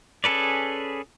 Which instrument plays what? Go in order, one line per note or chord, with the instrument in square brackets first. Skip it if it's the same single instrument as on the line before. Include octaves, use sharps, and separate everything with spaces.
[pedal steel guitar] C#4 G#4 A4 B4 D5